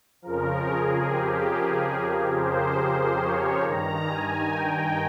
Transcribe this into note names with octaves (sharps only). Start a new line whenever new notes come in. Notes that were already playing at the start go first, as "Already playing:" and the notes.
F2 C#3 F3 A#4
G#4
G4
G#4
C5
C5
C#5
G2 D#3 A#5
G#5
G5